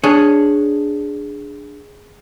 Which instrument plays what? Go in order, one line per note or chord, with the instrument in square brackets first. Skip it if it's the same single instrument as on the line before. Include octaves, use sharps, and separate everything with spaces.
[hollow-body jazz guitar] D4 C#5 [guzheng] G#4